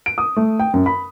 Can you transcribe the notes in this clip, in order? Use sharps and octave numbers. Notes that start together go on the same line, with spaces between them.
D7
D#6
A3
G5
F#2
B5